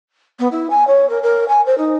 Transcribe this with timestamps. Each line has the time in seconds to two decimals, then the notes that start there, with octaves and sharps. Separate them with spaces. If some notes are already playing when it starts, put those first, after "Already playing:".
0.39 B3
0.51 E4
0.70 G#5
0.87 C#5
1.09 A#4
1.22 A#4
1.48 G#5
1.66 C5
1.78 D#4